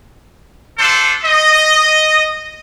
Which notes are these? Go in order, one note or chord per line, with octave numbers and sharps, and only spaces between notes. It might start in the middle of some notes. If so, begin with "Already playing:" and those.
D4 F4 A4 C5
D#5